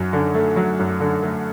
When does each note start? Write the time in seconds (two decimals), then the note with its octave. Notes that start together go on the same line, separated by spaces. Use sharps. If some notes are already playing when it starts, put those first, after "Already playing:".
Already playing: F#2 F#3
0.13 D3
0.34 A3
0.56 F#3
0.79 F#2
1.00 D3
1.23 A3